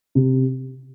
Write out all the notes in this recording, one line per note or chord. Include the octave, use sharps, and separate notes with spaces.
C3